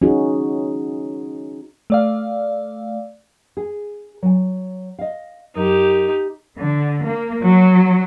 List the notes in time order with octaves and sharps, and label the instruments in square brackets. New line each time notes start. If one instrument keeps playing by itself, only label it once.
[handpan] C#4 D#4 F#4 G#4
[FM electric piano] A3 D5 F5
[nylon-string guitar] G#4
F#3 G#5
D#5 F5
[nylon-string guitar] F#2 [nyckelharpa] D#4 G4
[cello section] D3
A#3
F#3